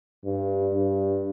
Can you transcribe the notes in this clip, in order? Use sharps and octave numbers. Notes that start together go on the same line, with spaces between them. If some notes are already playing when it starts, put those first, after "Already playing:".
G2
G2